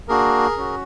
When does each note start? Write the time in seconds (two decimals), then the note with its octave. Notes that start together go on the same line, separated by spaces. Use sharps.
0.08 A#3 D4 F#4 G#4 A#4
0.57 C#4 F#4